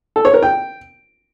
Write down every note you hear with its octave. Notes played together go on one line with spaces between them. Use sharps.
A4
C#5
A#4
G5